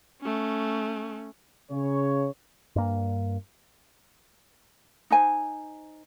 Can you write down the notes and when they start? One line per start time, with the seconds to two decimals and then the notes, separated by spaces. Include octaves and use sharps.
0.21 A3 C#4
1.71 C#3 C#5
2.76 G2 A#3
5.11 D#4 C5 G#5